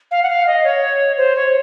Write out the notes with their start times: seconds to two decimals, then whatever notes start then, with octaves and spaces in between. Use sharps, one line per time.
0.11 F5
0.23 F#5
0.29 F5
0.47 D#5
0.64 C#5
1.17 C5
1.36 C#5